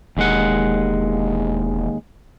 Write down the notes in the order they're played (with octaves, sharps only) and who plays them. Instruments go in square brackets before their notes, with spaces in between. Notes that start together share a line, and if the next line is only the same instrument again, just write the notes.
[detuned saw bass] E1 [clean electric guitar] D#2 G#3 F#5